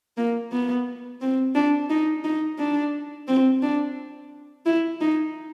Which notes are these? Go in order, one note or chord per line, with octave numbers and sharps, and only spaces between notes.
A#3
B3
C4
D4
D#4
D#4
D4
C4
D4
E4
D#4